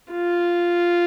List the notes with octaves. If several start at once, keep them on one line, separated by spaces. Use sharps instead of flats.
F4